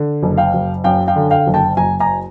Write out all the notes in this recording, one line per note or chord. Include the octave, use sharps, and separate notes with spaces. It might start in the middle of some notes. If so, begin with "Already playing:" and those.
Already playing: D3
F#1
F5 G5
F#1
F#2 F5 G5
F5 G5
D3
F5 G5
F#1
G5 A5
F#1 G#5 A#5
G#5 A#5